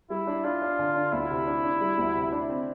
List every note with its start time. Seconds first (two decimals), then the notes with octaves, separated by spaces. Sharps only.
0.10 G3 E4
0.27 D4
0.44 D4 F4
0.62 D4
0.79 D3
0.96 D4
1.12 D2 E4
1.30 C3
1.47 D4
1.64 D4
1.81 G3
1.98 D2
2.16 C3
2.32 D4
2.49 C4